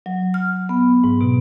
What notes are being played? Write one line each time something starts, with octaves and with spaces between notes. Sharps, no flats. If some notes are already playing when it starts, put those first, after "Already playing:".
F#3
F6
B3
G#2
B2